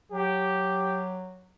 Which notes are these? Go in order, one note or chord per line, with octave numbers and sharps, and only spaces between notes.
F#3 G4